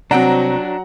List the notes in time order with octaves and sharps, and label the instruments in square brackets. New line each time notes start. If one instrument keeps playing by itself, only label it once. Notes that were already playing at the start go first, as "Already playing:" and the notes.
[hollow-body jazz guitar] C2 C4 [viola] F#3 [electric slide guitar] D4 G5 [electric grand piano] F#5 A#5